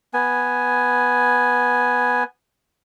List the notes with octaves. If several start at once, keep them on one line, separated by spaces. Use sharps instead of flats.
B3 G#5